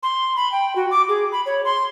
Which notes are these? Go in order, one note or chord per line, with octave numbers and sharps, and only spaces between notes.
C6
B5
G5
F#4
D6
G#4
B5
C#5
C6